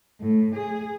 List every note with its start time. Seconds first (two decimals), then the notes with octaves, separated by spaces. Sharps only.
0.21 A2
0.55 G#4